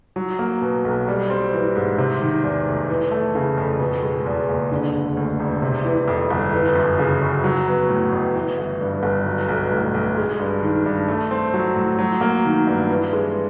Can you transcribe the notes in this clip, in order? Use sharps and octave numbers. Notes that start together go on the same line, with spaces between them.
F#3
A#3
B2
B1
G3
C4
E3
G#2
C3
D#3
E2
F1
E3
A3
C#3
F2
B2
G#3
E2
F#1
D3
E1
D2
E1
C3
E3
F2
G1
E3
F#2
C#3
F#2
F#3
B3
A2
A1
E3
G1
G2
G1
F#3
B1
A2
B1
G#3
G2
D#3
G2
A3
C4
F#3
A2
F#3
A#3
D#3
G2
E3
G#3